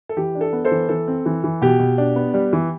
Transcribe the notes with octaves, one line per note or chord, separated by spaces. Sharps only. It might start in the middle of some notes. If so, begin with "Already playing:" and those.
A4
E3 G4
D4
A4
B3
A4 C5
E3
E3 A4
C4
E3
E3
B2 G4
B2
D4
B3
G3
E3